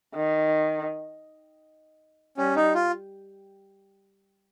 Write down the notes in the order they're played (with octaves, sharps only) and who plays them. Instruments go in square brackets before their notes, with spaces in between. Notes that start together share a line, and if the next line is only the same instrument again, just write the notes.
[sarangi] D#3
[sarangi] G3 [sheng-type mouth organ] C#4
[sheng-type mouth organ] D#4
F4